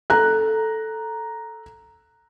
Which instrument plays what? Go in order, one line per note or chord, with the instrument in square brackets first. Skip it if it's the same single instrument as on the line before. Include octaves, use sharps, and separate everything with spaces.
[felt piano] A4 A#5 F#6